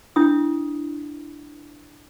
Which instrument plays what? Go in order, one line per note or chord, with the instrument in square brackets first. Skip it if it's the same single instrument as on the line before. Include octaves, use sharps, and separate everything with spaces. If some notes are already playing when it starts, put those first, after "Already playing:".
[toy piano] D4 E4 D#6